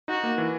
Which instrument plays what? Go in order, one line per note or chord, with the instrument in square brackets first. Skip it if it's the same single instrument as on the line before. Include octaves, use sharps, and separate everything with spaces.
[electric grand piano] D#4 [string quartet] F#4
[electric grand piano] A#3
E3